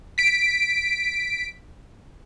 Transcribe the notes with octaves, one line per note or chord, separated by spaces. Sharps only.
B6 D7